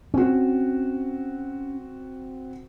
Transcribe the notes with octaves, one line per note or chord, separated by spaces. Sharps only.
C4 C#4 F#4